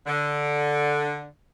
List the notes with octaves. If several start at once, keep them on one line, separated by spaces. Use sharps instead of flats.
D3